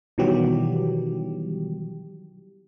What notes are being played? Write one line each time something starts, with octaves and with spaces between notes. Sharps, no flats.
B2 D#3 E3 F#3 G3 G4